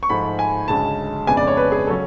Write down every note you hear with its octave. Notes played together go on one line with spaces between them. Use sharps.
C#6
G#2 F3 A3 B5
G#5
D2 C#3 G#3 C#4 A5
F2 C#3 G#3 B3 D4 G#5
D5
C#5
B4
G#4
C#3 F#3 C#4 A4